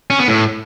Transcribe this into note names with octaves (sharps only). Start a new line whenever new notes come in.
C#4
B3
A2